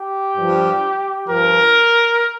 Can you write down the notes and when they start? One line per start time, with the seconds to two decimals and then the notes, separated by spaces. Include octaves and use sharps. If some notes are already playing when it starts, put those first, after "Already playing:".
Already playing: G4
0.37 G2 F3
1.27 G2 F3 A#4